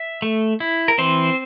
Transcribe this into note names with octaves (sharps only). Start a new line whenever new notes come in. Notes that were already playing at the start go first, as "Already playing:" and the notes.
Already playing: E5
A3
E4
A#4
E3 C4 C5